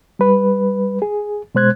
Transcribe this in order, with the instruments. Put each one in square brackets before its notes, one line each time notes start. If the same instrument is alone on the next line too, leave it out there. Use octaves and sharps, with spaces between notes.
[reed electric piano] G3 B4
G#4
B2 G#3 C5 F#6 G#6